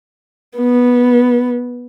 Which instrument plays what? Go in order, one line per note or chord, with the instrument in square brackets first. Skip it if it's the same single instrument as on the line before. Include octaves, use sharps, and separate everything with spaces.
[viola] B3